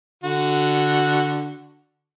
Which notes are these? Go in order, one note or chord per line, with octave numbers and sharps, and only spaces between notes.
D3 F#4